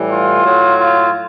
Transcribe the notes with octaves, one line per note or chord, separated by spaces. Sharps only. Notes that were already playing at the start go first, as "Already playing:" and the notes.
Already playing: A2 E3 G3
F4
A2 F#3
F4